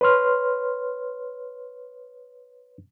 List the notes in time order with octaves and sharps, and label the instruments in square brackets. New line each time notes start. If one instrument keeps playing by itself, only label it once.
[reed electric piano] B4 C#5 C6 F6